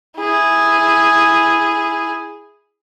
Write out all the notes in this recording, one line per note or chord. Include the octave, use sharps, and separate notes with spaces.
E4 G#4